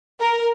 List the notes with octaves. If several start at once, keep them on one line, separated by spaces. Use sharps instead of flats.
A#4